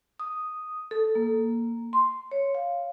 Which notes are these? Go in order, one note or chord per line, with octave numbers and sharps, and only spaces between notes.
D#6
A4
A#3
C6
C#5
F5